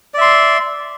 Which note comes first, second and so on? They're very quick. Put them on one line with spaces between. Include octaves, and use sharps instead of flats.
D5 E5 C6